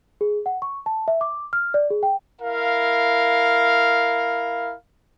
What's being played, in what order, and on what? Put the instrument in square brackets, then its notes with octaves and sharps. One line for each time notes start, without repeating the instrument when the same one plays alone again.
[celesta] G#4
F#5
C#6
A5
E5
D6
F6
D5
G#4
G5
[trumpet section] E4 A#4 F5